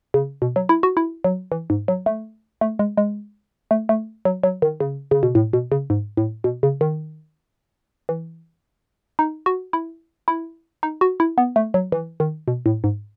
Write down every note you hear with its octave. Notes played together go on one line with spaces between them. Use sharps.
C#3
B2
F#3
E4
F#4
E4
F#3
E3
G#2
F#3
A3
A3
G#3
G#3
A3
A3
F#3
F#3
D#3
C#3
C#3
B2
A2
B2
C#3
G#2
A2
B2
C#3
D#3
E3
D#4
F#4
E4
E4
D#4
F#4
E4
B3
A3
F#3
E3
D#3
B2
A2
G#2